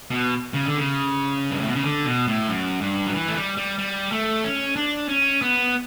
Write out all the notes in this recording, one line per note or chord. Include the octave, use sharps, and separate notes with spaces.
B2
C#3
D3
C#3
G2
A2
B2
C#3
D3
B2
A2
F#2
G2
F#3
E3
A3
G3
G3
G3
A3
C#4
D4
C#4
B3